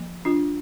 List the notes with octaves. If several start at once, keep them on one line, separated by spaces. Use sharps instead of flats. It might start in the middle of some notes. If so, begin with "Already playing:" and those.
Already playing: F3 A#3
D4 F4